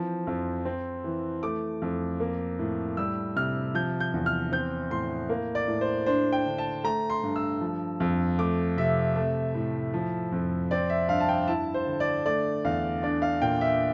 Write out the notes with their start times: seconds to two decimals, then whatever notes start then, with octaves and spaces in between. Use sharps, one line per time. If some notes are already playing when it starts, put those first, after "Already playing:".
Already playing: E3 F3 C4
0.27 F2
0.65 C4
1.04 E3
1.43 A3 D6
1.82 F2
2.20 A#3
2.59 A2
2.97 G3 E6
3.36 C3 F6
3.75 F3 G6
4.00 G6
4.14 E2
4.26 F6
4.52 C4 G6
4.90 A2 C6
5.29 A#3
5.55 D5
5.68 A2
5.81 C5
6.06 D4 C5
6.32 G5
6.46 D3
6.58 A5
6.84 A3 A#5
7.10 C6
7.23 G2
7.36 E6
7.61 F3
8.00 F2
8.39 A3 D6
8.77 C3 E5
9.16 A3
9.55 A2
9.94 F3
10.32 F2
10.71 C4 D5
10.90 E5
11.09 G2 F5
11.20 A5
11.29 G5
11.48 E4 A5
11.74 C5
11.87 D3
12.00 D5
12.26 A3 D5
12.65 E2 F5
13.03 D4 D5
13.22 F5
13.42 A#2 G5
13.61 E5